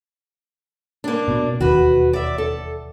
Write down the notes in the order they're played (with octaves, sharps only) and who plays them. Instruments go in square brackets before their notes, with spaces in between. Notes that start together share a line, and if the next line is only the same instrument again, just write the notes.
[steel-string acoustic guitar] A#3 D4
[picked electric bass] B2
[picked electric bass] E1 D#2 [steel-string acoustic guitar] F#4 B4
[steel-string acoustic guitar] D5 E5
A4